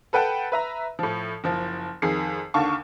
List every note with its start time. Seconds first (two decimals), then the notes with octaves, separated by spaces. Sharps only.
0.13 A4 B4 F#5 G5 A5
0.52 B4 E5 A#5
0.99 A2 F3
1.44 F#1 F3
2.02 F2 D#3 G#4 C7
2.54 D#2 D3 F5 A5 C#6